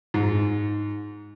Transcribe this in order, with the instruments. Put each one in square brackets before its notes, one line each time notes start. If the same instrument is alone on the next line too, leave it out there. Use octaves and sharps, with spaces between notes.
[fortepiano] G#2